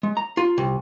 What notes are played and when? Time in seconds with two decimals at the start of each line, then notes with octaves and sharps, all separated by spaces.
0.03 G#3
0.17 A#5
0.37 F4
0.58 C2